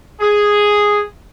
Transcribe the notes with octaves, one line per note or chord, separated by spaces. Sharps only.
G#4